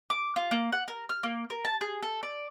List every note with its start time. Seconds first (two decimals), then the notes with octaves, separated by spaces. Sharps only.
0.10 D6
0.36 F4
0.51 A#3
0.72 F#5
0.88 A#4
1.09 F6
1.23 A#3
1.50 A#4
1.65 A5
1.81 G#4
2.03 A4
2.23 D5